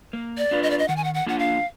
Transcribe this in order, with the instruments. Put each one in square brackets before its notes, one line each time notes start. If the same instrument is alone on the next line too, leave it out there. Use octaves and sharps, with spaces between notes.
[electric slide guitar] A#3
[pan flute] D5
[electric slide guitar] D4 F4 B4
[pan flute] D#5
D5
D#5
[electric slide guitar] D#3 [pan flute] F#5
[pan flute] G#5
F#5
F#5
[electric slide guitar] A#3 D4 F4 [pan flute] F#5
[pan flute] F5